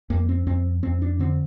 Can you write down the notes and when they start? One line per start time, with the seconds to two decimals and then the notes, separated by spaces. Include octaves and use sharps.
0.10 F2 A#3
0.29 C4
0.47 F2 C4
0.83 F2 C4
1.02 D4
1.19 D3 C4